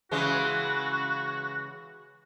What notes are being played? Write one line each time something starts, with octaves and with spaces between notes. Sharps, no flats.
C#3 E3 G#3 F#4